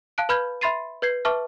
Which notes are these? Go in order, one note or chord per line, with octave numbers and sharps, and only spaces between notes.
F5 A5 F#6 D7
B4 B5 F6 G6 G#6
E5 B5 C6 A6 C7 D#7
B4 G6 G#6 C7
B4 E5 A5 C#6 D6 F6